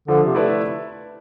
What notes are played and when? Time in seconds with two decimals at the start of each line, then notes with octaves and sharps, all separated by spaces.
0.08 D3 F3
0.25 C3
0.35 A3 E4 B4 D5